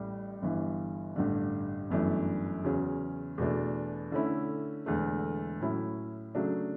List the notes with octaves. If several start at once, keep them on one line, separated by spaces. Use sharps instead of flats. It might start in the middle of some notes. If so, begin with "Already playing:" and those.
Already playing: A1 A2 G3
G1 G2 E3
A1 G2 D3
G1 F#2 E3 A3 D4
E2 C#3 F#3 C#4
E2 B2 A3 D4
D3 A3 C#4 E4
E1 E2 D3 A3
A2 F#3 C#4 E4
C#3 F#3 A3 D4